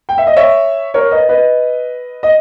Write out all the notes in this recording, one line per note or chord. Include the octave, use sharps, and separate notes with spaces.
G5
E5
D#5
C#5 E5
A#4 C#5
B4 D#5
B4 D#5
D#5